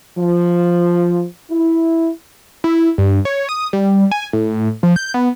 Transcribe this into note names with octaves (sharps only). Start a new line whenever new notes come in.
F3
E4
E4
G2
C#5
D#6
G3
G#5
A2
F3
G6
B3